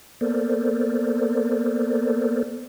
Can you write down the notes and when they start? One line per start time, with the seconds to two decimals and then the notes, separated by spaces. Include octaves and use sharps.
0.21 A#3 B3 A4 A#4 C5 D5